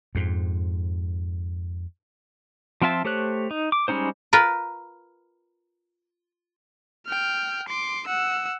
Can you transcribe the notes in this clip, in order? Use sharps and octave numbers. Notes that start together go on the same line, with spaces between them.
F2 G#2
F3 C4 F4 E5 A5
A3 G4 C5 C#5 F#6
D#4
D6
G3 G#3 C#4 D#4 C5
F4 A#4 B4
G5 F6
C6 D6
F#5 E6